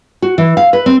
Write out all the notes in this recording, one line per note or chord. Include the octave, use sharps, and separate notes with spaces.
F#4
E3
F5
B4
C4